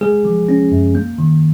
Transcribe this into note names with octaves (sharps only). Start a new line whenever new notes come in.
G#3 G#4
F3
C#4
F#2
A#3
D#3